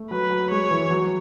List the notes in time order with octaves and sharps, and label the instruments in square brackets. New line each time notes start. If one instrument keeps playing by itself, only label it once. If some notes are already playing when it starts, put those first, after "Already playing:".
Already playing: [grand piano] A3
[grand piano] F#3 [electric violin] B4
[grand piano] F#3
[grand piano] G#3 [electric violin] C#5
[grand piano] E3
F#3